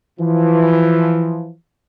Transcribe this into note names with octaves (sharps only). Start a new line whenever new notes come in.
E3 F3